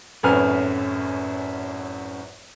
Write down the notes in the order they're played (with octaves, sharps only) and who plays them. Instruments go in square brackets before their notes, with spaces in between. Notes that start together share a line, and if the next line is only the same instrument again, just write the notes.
[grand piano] G#1 F#2 A2 B4 G#5 F6